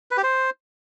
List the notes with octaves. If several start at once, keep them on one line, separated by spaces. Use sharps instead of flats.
B4
G4
C5